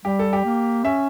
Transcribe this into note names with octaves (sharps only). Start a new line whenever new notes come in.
G3 G4
A4
G4
A#3
C#4 E5